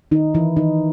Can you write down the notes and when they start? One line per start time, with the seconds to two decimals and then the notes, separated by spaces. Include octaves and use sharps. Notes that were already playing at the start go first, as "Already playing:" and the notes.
0.11 D#3 D#4
0.34 E3 E4
0.57 D#3 D#4